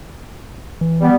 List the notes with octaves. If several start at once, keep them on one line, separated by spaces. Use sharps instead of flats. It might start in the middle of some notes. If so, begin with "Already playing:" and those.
E3
G3 B3